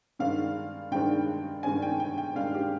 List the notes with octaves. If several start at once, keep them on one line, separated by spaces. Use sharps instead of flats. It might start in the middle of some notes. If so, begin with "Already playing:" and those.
G2 D#3 G#3 D4 F5
G2 D#3 G#3 D4 G5
G2 D#3 G#3 D4 G#5
G5
G5
G5
G2 D#3 G#3 D4 F5
G4